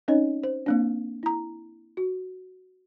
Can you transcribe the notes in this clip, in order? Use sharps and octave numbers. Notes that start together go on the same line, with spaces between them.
C4 C#4 D#4 C#5 D#5
C5
A#3 C4 D4
E4 A#5
F#4